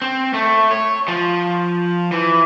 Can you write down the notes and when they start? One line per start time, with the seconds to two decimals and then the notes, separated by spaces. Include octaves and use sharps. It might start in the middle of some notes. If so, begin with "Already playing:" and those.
0.02 C4
0.34 A3
0.71 C#5
1.08 F3
2.12 E3